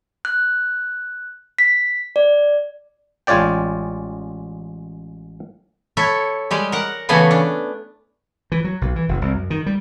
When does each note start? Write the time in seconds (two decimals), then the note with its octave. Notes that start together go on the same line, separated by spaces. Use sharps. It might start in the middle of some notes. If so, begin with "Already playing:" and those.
0.25 F#6
1.59 B6
2.16 D5
3.27 A1 G#3 F4 C#5 D5 G5
5.97 E4 A4 C#5 E5
6.51 G3 G#3 G4
6.72 A#4 F#5
7.09 C#3 E3 A3 B3 C#5 G#5
7.31 D4
8.52 E3
8.64 F#3
8.81 B1
8.96 E3
9.08 F1
9.22 C2
9.34 F#2
9.50 D#3
9.66 G3